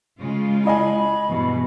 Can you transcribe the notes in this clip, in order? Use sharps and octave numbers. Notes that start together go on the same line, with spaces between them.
C#3 G#3 F4
E4 D#5 G#5 B5
E2 G2 B2